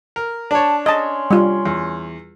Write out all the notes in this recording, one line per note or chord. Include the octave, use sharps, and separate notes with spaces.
A#4
D4 C#5 A5
C#4 D#5 A5 C6
G3 F4
E2